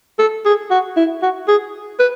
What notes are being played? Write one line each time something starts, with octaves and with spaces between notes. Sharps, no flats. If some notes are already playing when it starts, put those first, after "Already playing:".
A4
G#4
F#4
E4
F#4
G#4
B4